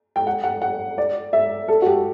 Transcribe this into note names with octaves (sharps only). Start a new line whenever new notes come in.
G5
F#5
F#5
F#5
D5
E5
A4
F#4
G4